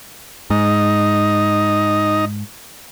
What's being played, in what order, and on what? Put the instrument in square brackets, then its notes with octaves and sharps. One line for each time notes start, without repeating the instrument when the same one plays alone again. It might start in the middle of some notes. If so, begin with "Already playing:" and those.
[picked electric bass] G#2 [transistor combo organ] D#4